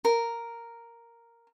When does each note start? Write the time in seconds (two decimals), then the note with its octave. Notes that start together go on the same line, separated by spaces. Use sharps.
0.05 A#4